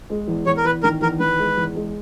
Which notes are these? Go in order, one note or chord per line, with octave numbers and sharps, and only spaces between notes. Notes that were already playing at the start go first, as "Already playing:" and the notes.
G#3
E2
E2 C#5
A#4
E2 B4
D#3 A#4
E2 A#4
D#3 B4
G#3
E2
G#3